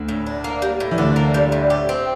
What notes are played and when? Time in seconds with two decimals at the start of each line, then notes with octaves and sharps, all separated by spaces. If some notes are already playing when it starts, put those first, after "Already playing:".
Already playing: D2 D3
0.09 A2
0.26 D4
0.44 A#3
0.62 G3
0.80 A2
0.91 E3
0.98 D2 D3 D4
1.16 A#3
1.34 G3
1.52 A2
1.70 G4
1.89 C4